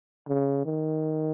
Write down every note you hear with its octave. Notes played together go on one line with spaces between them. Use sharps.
C#3
D#3